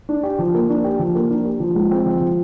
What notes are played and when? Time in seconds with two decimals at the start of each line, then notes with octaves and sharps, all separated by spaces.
0.09 D4
0.23 G4
0.39 F3
0.54 A#3
0.69 D4
0.84 G4
0.99 F3
1.15 A#3
1.30 D4
1.45 G4
1.60 F3
1.75 G#3
1.91 C4
2.06 F3
2.21 F3